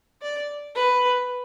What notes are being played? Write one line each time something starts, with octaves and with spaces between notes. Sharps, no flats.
D5
B4